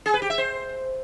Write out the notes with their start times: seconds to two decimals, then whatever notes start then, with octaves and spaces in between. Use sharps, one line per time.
0.06 G#4
0.14 B4
0.22 G4
0.30 E5
0.38 C5